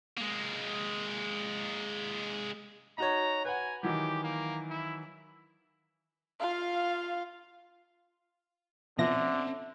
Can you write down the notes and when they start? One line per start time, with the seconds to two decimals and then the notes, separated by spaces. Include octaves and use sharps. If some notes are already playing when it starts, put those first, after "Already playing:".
0.18 G#3 A#3
2.98 D#4 F#4 C#5 A#5
3.45 B4 F#5 G#5
3.83 D#3 E3 F#3 G4
4.23 A#3
4.70 E4
6.39 F4 F5
8.98 B2 D3 F3 C4 C#4 E5 A#6